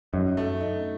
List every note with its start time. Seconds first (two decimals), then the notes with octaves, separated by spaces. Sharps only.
0.13 F#2 D#4
0.37 A3
0.61 D#4